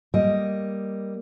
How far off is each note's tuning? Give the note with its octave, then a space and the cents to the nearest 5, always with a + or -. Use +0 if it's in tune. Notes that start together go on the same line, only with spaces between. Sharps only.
G3 +0 A#3 +0 D#5 +0